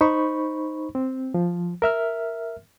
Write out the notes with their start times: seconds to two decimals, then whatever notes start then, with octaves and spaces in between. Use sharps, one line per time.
0.01 D#4 C5 B5 C#6
0.95 C4
1.34 F3
1.82 A#4 E5 F6